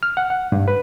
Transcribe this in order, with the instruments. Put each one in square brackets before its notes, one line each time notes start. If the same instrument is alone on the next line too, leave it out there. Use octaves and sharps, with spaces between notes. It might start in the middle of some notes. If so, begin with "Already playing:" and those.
[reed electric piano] F6
F#5
F#5
G2
B4